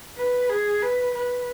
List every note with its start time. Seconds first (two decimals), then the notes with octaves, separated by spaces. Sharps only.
0.17 B4
0.49 G#4
0.82 B4
1.14 B4